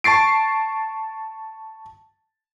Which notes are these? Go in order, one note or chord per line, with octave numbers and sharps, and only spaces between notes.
A5 C#6 A6 C7 D7